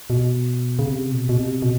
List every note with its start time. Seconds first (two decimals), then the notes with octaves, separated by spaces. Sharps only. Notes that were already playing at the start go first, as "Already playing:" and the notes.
0.10 B2
0.79 C#3
0.86 C3
1.12 B2
1.29 B2
1.37 C3
1.62 B2